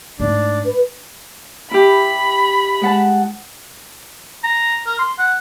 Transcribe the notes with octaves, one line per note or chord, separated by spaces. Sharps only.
G#2 A3 D4
B4
E4 G4 B5
G#3 F#5 A5
A#5
A#4
C6
F#5